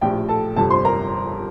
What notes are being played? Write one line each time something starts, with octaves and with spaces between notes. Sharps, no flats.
A#1 A2 F3 G4 G5
A4 A5
G1 F2 C3 A4 A5
C5 C6
A#4 A#5